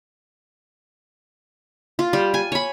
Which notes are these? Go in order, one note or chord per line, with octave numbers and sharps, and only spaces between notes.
F4
G3
G#5
C#5 B5